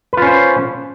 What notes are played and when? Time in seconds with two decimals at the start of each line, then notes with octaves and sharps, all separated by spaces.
0.13 B4
0.17 F4
0.22 C#4
0.26 C5